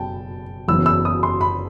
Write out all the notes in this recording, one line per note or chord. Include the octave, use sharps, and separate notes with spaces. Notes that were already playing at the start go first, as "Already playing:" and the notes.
Already playing: F#1 B2 G5 A5
F#1 F#2 E3 B3 E6
E6
D#6
C6
B5